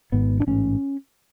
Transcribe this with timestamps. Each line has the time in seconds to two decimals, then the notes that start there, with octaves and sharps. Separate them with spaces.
0.12 G#1 G#2 B3
0.40 D4
0.47 A1 G#2 C#4